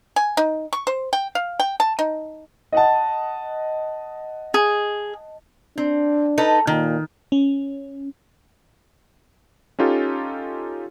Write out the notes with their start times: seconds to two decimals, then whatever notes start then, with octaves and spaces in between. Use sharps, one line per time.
0.16 G#5
0.37 D#4
0.73 C#6
0.87 C5
1.13 G5
1.35 F5
1.60 G5
1.80 A5
1.99 D#4
2.72 D#5 F#5 A5
4.54 G#4
5.78 C4 D4
6.38 D#4 A4 B4
6.67 A#2 D#3
7.32 C#4
9.79 C#4 D#4 F4 G4 A4